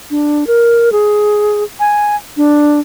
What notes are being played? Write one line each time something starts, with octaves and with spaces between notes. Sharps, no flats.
D4
A#4
G#4
G#5
D4